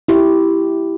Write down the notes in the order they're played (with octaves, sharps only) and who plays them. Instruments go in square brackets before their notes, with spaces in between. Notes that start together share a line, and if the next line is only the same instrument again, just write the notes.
[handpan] E4 G4